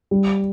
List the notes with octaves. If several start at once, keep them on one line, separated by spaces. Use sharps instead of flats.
G3